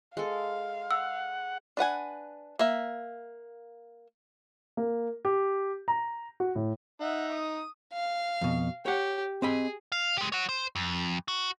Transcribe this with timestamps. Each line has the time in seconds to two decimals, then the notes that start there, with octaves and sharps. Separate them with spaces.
0.17 G#3 A4 F5
0.91 F#5 E6
1.77 D4 B4 F#5 G#5
2.59 A#3 E5
4.77 A#3
5.25 G4
5.88 A#5
6.40 F#4
6.55 A2
7.01 D#4 E5 F#5
7.33 D#6
7.93 F5
8.41 F2 B2
8.86 G4 C#5 F#5
9.42 C4 G#4 D#5 B5
9.92 F5
10.18 G#3 G4
10.32 C#5 F#5
10.49 C5
10.76 F2
11.28 F#4